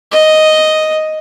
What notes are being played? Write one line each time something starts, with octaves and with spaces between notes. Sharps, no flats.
D#5